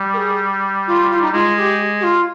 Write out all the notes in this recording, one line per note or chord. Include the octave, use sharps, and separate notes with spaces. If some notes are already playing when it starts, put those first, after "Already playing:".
Already playing: G3
A#4
G#4
F4
F4
D#4
G#3 F4
G#4
G4
G4
F4